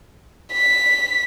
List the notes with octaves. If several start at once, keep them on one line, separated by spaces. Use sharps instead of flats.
B6